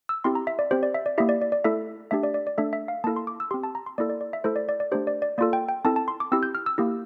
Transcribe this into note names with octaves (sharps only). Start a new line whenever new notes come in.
E6
C4 E4 G4 C6
A#5
E5
D5
C4 G4 C5
D5
E5
D5
A#3 E4 G4 E5
D5
D5
D5
A3 E4 A4 E5
A3 D4 G4 E5
D5
D5
D5
A3 D4 A4 E5
E5
F5
A#3 E4 A4 A5
C6
D6
E6
C4 G4 C6
A5
A#5
C6
A#3 E4 A4 D5
D5
D5
E5
A3 E4 A4 C5
D5
D5
D5
A3 D4 G4 C5
D5
D5
A#3 F4 A4 D5
G5
G5
C4 E4 A4 A5
A5
C6
D6
C4 E4 G4 E6
G6
F6
E6
A#3 E4 G4